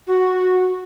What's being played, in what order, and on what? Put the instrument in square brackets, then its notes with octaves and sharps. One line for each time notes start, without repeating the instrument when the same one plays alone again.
[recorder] F#4